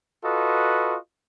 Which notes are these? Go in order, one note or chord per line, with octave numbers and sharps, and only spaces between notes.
F4 F#4 A4 B4 D#5